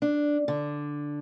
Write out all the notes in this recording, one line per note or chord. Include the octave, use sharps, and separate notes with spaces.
D4
D3